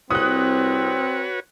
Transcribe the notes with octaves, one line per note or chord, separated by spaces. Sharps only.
C2 C4 F#4 B4 C#5 D#6 F#6